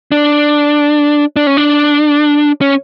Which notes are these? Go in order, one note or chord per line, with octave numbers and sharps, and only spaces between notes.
D4
D4
C#4
D4
C#4